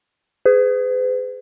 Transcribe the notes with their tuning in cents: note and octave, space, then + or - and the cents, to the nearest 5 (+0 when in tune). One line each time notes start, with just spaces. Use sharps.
G#4 +0 B4 +45